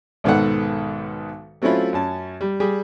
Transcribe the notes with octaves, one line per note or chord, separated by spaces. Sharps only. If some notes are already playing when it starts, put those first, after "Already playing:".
B1 G#2 D#3 B3 A4 F#5
F#3 A3 C4 C#4 E4 F4
F#2 C#4 A5
G3
G3 G4 G#4